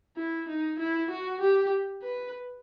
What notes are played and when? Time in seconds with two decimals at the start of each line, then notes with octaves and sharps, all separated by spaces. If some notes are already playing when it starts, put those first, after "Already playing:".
0.17 E4
0.48 D#4
0.79 E4
1.10 F#4
1.41 G4
2.03 B4